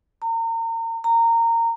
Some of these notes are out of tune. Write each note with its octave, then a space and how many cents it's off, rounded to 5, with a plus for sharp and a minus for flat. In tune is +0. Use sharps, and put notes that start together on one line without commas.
A#5 -35
A#5 -20